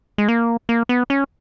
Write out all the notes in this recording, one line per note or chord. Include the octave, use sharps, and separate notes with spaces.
G#3
A#3
A#3
B3
C#4